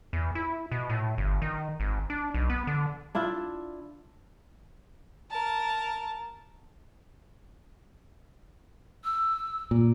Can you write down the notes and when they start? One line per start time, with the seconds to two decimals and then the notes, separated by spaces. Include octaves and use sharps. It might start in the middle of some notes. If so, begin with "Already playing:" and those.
0.13 E2
0.35 E4
0.72 B2
0.89 A2
1.18 G1
1.42 D#3
1.80 G#1
2.10 D4
2.34 B1
2.50 B3
2.67 D3
3.15 D4 E4 F4 E5
5.30 A#4 A5
9.04 E6
9.71 A#2